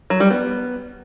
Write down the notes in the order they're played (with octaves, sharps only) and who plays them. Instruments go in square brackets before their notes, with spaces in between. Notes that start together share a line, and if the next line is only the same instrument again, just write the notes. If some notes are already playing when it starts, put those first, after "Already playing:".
[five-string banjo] F#3
G3
B3